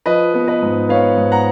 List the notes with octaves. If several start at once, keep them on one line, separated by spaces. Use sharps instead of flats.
F3 B4 D#5
B3
B4 D#5
G#2
B3 C#5 F5
G#2
F#5 A#5